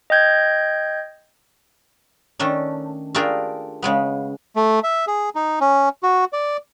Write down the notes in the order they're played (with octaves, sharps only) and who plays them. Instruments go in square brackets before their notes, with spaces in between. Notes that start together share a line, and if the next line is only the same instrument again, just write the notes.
[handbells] D#5 G5 G6 G#6
[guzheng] D#3 A3 C#4 D4
A3 D4 F4 G4 G#4 A#4
C#3 G#3 B3
[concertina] A3
E5
G#4
D#4
C#4
F#4
D5